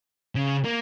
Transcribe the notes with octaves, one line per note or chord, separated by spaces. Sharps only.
C#3
A#3